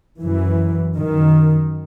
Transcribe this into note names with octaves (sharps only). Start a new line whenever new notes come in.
F#2 E3
F#2 D#3